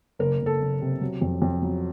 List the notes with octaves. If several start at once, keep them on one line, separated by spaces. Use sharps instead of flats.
F#1 A#4
F#1
A4
F#1
C3
F#3
F2
F2
F#3